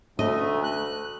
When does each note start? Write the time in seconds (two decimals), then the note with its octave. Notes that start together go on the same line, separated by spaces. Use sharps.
0.19 D2 A3 D#5
0.64 F#6